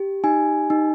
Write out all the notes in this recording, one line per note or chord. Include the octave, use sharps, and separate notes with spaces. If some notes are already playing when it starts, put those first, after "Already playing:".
Already playing: G4
D#4 G#5
D#4